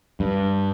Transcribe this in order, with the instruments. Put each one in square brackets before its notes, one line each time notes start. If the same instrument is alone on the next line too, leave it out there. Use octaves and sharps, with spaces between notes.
[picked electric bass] G2